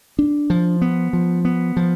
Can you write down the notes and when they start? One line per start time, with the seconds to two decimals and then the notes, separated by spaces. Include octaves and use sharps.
0.19 D4
0.50 F3
0.82 B3
1.13 F3
1.45 B3
1.77 F3